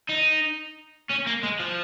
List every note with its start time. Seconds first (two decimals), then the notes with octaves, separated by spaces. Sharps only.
0.09 D#4
1.10 C#4
1.26 A#3
1.43 G#3
1.60 F3